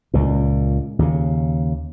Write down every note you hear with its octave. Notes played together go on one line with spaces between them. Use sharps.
C#2 A#2
D#2 C#3